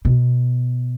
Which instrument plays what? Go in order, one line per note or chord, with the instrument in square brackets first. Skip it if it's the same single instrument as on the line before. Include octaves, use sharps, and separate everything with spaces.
[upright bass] B2